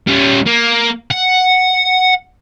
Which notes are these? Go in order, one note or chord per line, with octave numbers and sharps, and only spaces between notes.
G3 C#4
A#3
F#5